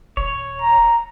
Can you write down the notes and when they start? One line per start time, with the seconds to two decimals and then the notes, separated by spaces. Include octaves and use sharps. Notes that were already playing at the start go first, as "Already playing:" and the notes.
0.17 D#1 C#5
0.62 A#5